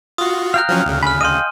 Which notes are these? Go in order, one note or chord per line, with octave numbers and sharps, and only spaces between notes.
F4 F#4 D#6
F5 G5 A#5 F6 F#6
F3 F#3 C#4
D2 C#3
G#5 B5 F6
D#5 F5 G5 C6 D#7